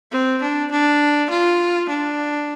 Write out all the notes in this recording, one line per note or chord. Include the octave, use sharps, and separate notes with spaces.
C4
D4
D4
F4
D4